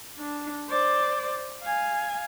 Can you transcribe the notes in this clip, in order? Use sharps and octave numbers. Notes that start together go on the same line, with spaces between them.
D4
C5 D5
F5 G#5